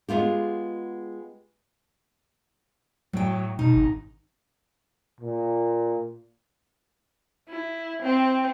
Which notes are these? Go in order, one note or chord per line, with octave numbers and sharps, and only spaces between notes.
G#3 B3 F4 G4
A2 F#3 G5
B2 D#4
G#1
A#2
E4
C4